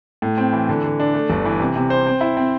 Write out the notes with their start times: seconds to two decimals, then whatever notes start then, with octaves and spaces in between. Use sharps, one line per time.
0.22 A2
0.38 C4
0.53 E3
0.69 D3
0.84 D3
1.00 D4
1.14 A3
1.30 G1
1.45 E3
1.60 C3
1.76 C3
1.90 C5
2.07 C4
2.21 E4
2.37 C4